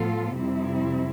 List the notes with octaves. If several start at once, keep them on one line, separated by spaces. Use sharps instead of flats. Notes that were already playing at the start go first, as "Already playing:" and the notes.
Already playing: A2 F3 B3 F4 A4
F2 C3 G3 C4 E4